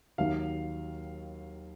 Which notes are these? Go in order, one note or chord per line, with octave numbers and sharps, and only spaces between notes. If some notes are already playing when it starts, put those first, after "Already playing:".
D#2 D#3 F#3 F5